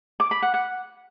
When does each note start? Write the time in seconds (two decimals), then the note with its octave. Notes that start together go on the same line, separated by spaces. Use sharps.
0.20 D6
0.31 B5
0.42 F#5
0.54 F#5